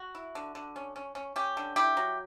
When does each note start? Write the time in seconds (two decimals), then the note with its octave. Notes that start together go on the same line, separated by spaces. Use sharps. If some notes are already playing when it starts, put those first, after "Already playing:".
Already playing: F#4
0.15 E4
0.35 D3
0.55 D3
0.76 C#4
0.96 C#4
1.15 C#4
1.36 C#4 G4
1.57 D3
1.76 E4 G4
1.97 F#3